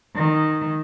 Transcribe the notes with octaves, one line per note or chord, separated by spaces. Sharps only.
D#3